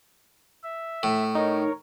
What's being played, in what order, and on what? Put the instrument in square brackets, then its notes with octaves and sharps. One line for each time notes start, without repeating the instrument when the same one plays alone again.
[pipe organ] E5
[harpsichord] A2
[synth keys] D#4 [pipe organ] A#4 C#5